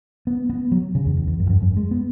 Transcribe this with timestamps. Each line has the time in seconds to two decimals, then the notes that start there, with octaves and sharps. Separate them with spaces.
0.27 B3
0.50 B3
0.72 F#3
0.95 C#3
1.05 E2
1.17 E2
1.27 E2
1.40 F#2
1.46 E2
1.50 F#2
1.62 F#2
1.77 G#3
1.91 B3